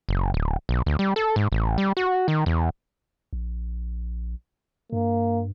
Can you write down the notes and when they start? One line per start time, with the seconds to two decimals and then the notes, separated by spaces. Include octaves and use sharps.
0.09 F#1
0.34 D1
0.69 B1
0.86 D2
0.99 G3
1.16 A4
1.36 G#2
1.52 A1
1.78 G3
1.97 F#4
2.28 D#3
2.46 E2
3.33 A#1
4.93 G2 A#3